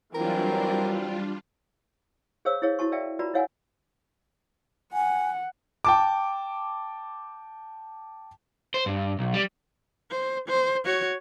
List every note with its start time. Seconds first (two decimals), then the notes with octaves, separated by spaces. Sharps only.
0.15 E3 F#3 G3 C4 D4 F4 A#4
2.45 G#4 C5 C#5 F5 E6
2.62 E4 G#4 C#5 F5
2.79 E4 F#4 A5 C#6
2.92 B4 D5 E5 F5 G5 A5
3.19 F4 F#4 B4 D5 A#5 B5
3.34 E4 A#4 C#5 F5 F#5 G#5
4.93 F#5 G#5
5.84 G5 A5 D6
8.74 C5
8.86 G2
9.19 B1
9.34 G3
10.11 C5
10.48 C5
10.84 F#4 C#5